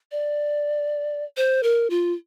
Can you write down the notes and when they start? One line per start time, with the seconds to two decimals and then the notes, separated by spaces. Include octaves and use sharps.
0.12 D5
1.37 C5
1.63 A#4
1.90 F4